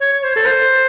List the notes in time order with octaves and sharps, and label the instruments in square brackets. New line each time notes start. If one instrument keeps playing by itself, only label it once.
[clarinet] C#5
C#5
C5
A4
C5